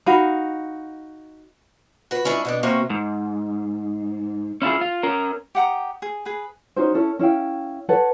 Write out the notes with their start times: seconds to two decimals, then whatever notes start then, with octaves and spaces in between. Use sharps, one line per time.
0.06 D#4 F#4 F5 B5
2.11 F#4 B4
2.25 G#3 C#4 D4 E4
2.45 B2 B3 D4
2.63 C3 A#3 B3 C#4 F#4
2.90 G#2
4.62 C#4 E4 F4 G#4
4.81 F4
5.03 C#4 A#4
5.55 G4 F#5 A#5 D#6
6.02 G#4
6.25 G#4 B4
6.76 C#4 D#4 F#4 C5
6.94 C#4 E4 A4
7.19 C#4 E4 F5 G5
7.89 A4 B4 C#5 F#5